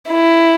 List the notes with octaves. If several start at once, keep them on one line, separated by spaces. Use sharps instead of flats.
E4